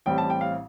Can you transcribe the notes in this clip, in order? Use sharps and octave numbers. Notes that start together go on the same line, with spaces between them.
A1 A2 G3 C4 G5
A5
G5
F5